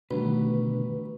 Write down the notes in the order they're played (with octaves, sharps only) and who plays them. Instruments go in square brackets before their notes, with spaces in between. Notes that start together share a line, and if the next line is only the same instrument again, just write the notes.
[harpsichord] A1 [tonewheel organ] B2 D3 [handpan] D#3 G3 F#4 [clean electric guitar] B4